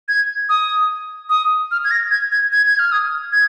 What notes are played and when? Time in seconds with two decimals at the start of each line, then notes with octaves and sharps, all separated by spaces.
0.08 G#6
0.49 D#6
1.30 D#6
1.71 F6
1.84 G#6
1.91 A#6
2.11 G#6
2.32 G#6
2.52 G#6
2.66 G#6
2.79 F6
2.92 D#6
3.32 G#6